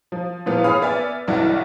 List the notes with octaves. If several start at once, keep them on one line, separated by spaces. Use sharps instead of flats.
F3
A#2 E3 F3 B3 F4
G#4 C#5 F5 B5 D#6 F6
B3 D5 E5 G#5
B1 G2 E3 E4 D5 F#5